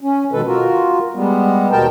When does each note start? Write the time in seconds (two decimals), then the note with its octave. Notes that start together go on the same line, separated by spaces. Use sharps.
0.01 C#4
0.33 B2 D#3 G#3 A4 B4
0.47 F4 F#4 A#4
1.15 G3 G#3 B3
1.72 D#2 B2 A#4 G5 A5